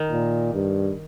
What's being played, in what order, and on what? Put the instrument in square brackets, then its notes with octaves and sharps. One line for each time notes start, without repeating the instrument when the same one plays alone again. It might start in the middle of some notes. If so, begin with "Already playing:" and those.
Already playing: [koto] D#3
[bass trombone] A#2
G2